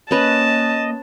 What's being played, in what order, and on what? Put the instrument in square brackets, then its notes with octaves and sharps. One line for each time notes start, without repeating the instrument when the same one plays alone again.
[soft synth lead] A#3 [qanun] C#4 B4 [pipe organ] D#5 [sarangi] A5